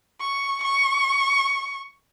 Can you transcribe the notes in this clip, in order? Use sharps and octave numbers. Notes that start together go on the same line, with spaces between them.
C#6
C#6